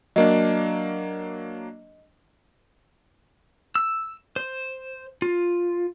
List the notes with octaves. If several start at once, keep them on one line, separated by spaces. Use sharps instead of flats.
F#3 A#3 D4 D#5
E6
C5
F4